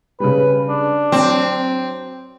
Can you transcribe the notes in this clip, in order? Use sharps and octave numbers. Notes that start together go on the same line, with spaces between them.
C#3 G3 B4
D4
F#3 C4